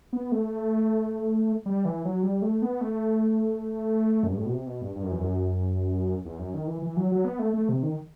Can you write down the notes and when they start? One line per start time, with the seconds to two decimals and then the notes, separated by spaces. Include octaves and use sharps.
0.13 B3
0.32 A3
1.66 G3
1.85 E3
2.05 F#3
2.23 G3
2.42 A3
2.62 B3
2.81 A3
4.23 F#2
4.31 G2
4.38 A2
4.46 B2
4.53 C3
4.67 B2
4.82 G2
4.96 G2
5.03 F#2
5.12 E2
5.20 F#2
6.25 E2
6.39 F#2
6.54 D#3
6.67 E3
6.82 E3
6.97 F#3
7.12 F#3
7.25 B3
7.39 A3
7.54 A3
7.69 C3
7.83 D#3